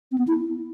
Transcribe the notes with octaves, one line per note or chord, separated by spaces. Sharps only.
C4
B3
E4